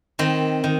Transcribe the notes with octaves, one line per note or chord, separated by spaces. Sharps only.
D#3 C4
D#3